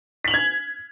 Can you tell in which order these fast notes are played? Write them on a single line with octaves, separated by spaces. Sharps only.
B6 F#7 F7 G#6